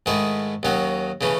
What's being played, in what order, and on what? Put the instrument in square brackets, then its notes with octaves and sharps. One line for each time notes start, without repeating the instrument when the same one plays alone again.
[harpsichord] G#2 D#3 A3 E4 G#4
D#2 D#3 F#3 C#4 F#4
C#3 E3 A3 C#4